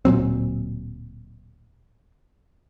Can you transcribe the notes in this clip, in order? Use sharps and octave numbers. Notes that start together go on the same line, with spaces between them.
D1 A#2 F#3 C4